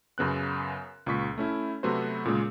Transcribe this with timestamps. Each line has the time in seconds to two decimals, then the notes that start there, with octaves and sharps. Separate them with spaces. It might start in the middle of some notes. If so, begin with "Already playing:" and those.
0.18 F#2 C#3 B3 F#6
1.06 C#2 A#2 C#6 B6
1.38 A3 C#4 E4
1.83 C3 F#3 A3 B3 F#4 C5
2.25 A#2 C#3 G#3